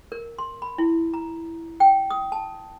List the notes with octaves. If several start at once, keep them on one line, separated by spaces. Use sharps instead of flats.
A#4
C6
B5
E4
A#5
G5
D#6
A5